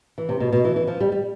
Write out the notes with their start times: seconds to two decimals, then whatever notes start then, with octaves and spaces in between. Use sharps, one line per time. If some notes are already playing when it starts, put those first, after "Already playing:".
0.18 E3
0.29 C3
0.40 B2
0.53 B2
0.65 E3
0.76 E3
0.87 F3
1.00 G3
1.12 G3